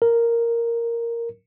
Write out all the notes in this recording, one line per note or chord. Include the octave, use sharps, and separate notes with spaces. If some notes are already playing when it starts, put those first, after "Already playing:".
A#4